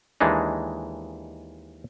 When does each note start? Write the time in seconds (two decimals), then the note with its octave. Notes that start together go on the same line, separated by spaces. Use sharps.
0.21 D#2 E3 G#3 D4 D#4